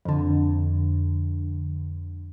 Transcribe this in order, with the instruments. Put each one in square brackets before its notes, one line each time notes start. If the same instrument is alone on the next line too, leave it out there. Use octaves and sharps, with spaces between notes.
[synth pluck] F2 D3